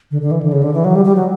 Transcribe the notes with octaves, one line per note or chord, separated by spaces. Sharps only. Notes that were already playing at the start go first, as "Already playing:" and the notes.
D3
D3
E3
D3
C#3
D3
E3
F#3
G3
G3
F#3